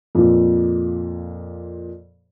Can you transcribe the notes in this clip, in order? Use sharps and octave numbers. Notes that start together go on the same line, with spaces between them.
F2 A#2